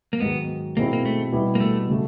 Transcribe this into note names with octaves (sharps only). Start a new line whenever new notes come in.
A#3
G#2 D#3 F#3 B3
B2 G#3 A#3 C4 E4
A#3
A3
B2 G3 B3 E4 G4
A#3
A3
C#3 F#3 A3